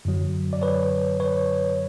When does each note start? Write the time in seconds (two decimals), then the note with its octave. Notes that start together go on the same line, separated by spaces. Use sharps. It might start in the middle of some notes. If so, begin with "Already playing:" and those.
0.05 F#2 D3 F#3
0.53 D5
0.62 B4 C#5
1.20 B4 C#5